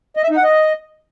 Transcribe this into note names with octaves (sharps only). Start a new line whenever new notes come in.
D#5
E5
D#4
F#5
D#5